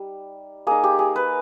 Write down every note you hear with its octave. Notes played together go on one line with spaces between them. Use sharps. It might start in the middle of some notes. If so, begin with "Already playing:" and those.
Already playing: G3 D#4
A#3 D#4 G#4
G4
G#4
B4